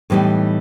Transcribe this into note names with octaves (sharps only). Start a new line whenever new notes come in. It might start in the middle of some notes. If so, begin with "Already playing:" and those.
A2 E3 G3 B3 D#4